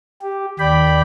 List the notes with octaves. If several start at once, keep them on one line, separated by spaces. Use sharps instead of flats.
G4
D#2 D5 G5 B5